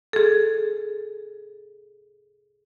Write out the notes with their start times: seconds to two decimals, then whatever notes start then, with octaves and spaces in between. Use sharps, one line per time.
0.13 G#4 A4